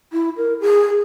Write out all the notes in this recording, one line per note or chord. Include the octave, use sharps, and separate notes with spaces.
E4
A#4
G#4